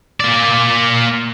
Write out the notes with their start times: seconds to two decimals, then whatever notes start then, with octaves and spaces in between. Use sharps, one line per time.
0.20 A#3 D5